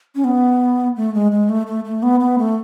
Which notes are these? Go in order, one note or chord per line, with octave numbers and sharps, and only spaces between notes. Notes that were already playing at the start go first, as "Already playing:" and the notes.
C#4
B3
A3
G#3
G#3
A3
A3
A3
B3
B3
A3